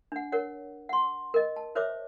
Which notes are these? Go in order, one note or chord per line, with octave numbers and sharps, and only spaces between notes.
D4 F#5
A#4 C#5 F#5
F#5 C6
A#4 D#5
A5
A#4 C5 C#5 E5 D6